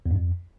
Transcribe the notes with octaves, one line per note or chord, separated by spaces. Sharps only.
E2
G2
F2